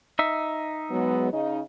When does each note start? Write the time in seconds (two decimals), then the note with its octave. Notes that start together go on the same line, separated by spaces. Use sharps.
0.19 D#4 E5
0.91 F#3 G#3 B3
1.33 C#3 D#4